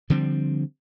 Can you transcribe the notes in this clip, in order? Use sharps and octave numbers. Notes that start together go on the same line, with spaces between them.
D3 F3 G3 C4